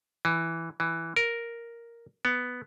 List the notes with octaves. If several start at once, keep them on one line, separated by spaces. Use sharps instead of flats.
E3
E3
A#4
B3